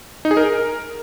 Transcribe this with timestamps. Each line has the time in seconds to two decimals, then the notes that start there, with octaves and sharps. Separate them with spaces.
0.25 D#4
0.31 G#4
0.37 A#4